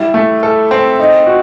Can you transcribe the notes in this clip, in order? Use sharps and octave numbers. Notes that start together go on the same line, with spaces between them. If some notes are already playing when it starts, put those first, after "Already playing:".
Already playing: G3 E4
A3
A4
C4
D#4
F#4